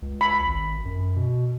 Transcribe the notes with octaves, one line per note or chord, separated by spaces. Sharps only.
C#2
B5
G#1
F#2
B2